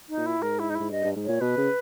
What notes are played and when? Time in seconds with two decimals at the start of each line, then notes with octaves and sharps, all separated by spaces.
0.09 D#4
0.17 A#2
0.26 E4
0.42 G#2 A#4
0.59 E4
0.70 D#4
0.75 E4
0.80 G#2
0.91 G2 D#5
1.04 G2
1.16 G#2
1.25 A#2 C#5
1.41 B2 B4
1.57 C#3